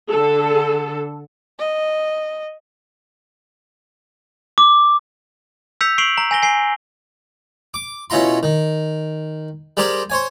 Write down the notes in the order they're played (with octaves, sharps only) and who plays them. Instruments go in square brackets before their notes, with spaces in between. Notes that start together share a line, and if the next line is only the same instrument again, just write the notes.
[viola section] D3 A4
[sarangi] D#5
[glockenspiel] D6
E6 G6 B6 C#7 F7
C#6 C7 D7 F7 F#7
A#5
G#5 A#6 G7
G#5 C7 D7 G7
[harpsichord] D6
B2 C#4 E4 F4 A#5 C6
D#3
G3 G4 G#4 A#4 C5
C5 C#5 G#5